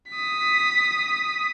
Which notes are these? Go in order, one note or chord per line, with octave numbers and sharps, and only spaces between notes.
D#6 B6